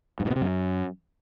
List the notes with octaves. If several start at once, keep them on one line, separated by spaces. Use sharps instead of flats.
G2
G#2
B2
C3
F#2